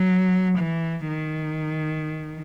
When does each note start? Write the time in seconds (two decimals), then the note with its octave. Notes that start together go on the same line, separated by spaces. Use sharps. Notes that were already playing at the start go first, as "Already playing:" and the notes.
Already playing: F#3
0.58 E3
1.08 D#3